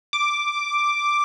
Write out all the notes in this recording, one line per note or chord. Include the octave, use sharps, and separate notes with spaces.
D6